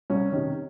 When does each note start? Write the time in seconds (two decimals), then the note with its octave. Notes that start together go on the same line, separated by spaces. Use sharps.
0.10 C2 C#4
0.32 C3 D#3 C#4